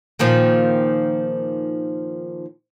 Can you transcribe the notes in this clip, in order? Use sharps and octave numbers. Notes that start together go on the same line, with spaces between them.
A#2 D#3 F3